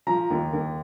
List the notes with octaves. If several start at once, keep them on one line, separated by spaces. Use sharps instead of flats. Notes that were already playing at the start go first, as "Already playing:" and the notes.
F3 A#5
D#2
D#2